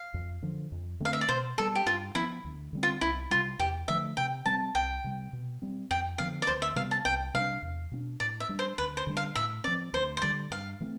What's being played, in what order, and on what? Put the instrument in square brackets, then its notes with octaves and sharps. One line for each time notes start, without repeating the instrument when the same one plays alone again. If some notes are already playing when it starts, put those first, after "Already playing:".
Already playing: [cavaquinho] F5
[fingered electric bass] F2
D3 F3
F2
[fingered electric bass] D3 A3 C4 [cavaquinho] F5
[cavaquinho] E5
D5
[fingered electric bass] B2 [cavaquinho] C5
[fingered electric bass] G3 B3 [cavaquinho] A4
[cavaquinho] G4
[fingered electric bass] G2 [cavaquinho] F4
[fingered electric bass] F3 B3 [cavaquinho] E4
[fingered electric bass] D2
D3 G3 C4
[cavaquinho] F4
[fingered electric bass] C2 [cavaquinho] E4
[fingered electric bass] C3 G3 [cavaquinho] F4
[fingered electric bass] E2 [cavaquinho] G4
[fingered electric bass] D3 F3 A3 [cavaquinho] E5
[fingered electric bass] C3 [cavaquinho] G5
[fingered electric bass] G3 C4 [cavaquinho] A5
[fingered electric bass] C2 [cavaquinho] G5
[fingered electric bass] C3 G3
B2
G3 C4
[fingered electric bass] F2 [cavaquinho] G5
[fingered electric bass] D3 F3 B3 [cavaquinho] F5
[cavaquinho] D5
[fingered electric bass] D2 [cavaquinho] C5
[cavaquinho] E5
[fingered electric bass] C3 G3 B3 [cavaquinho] F5
[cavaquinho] A5
[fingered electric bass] C2 [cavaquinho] G5
[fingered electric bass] C3 G3 D4 [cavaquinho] F5
[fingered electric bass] E2
B2 B3 D4
[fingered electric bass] A2 [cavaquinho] D5
[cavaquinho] E5
[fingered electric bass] G3 D4
[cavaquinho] C5
[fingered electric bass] D2 [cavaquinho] B4
[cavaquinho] C5
[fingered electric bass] D3 G3 D4
[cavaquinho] F5
[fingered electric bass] A2 [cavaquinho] E5
[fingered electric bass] F3 C4 [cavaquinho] D5
[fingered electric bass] D2 [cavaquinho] C5
[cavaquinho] C5
[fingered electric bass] D3 G3 [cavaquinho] D5
[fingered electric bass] G2 [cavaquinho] F5
[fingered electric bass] E3 A3 C4